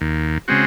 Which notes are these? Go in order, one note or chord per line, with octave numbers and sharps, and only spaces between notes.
D#2
C#3 G#3 C4 F#4